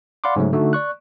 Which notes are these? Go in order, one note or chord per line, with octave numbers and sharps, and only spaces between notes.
D5 F5 F#5 B5 C6 D6
G#2 C#3 F#3 A3
D3 A3 D#4 F#4
D5 C#6 F#6